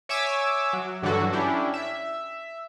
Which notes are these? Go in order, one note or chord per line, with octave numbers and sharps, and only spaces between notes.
C#5 E5 G#5 D6 E6
F#3
G2 D3 E3 F#3 F#4 A4
C#4 D4 E4 G4
E5